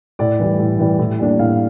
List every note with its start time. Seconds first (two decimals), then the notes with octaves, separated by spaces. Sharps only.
0.19 A2 D5
0.40 E3 G3
0.59 A2
0.79 E3 G3
0.99 A2
1.19 G3 A#3 D4
1.39 A2 F5